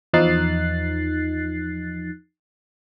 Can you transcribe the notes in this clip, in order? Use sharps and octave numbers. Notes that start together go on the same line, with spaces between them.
E2 F3 D#4 F#6 A6 C7